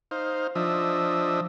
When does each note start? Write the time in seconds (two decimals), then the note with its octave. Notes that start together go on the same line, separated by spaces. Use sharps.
0.11 D#4 C5 F5
0.55 F3 D4 D#5 E5